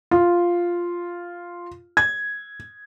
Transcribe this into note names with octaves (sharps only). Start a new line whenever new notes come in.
F4
G#6